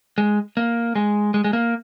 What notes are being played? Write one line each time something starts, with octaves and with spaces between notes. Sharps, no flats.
G#3
A#3
G#3
G#3
G#3
A#3